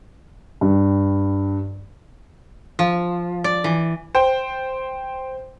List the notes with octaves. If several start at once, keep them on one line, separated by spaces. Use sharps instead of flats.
G2
F3
D5
E3
C5 G5